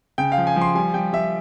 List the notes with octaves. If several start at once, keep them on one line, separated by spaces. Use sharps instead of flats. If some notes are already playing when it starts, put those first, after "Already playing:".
C#3 G5
F5
F3
G#5
F3
C6
G3 G#5
G3 G5
G3 E5